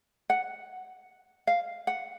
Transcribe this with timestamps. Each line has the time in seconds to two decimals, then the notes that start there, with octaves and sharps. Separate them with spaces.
0.30 F#5
1.47 F5
1.87 F#5